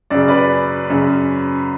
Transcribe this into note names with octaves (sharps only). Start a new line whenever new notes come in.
F#2 C#3 D5
B4 D5
F#2 C#3